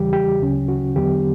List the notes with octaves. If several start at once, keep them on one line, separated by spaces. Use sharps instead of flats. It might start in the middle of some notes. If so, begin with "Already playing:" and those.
Already playing: E2 C#3 E3 G3 G4
G4
D2 C#3 F#3 C#4
F#4
E2 D3 F#3 B3 G4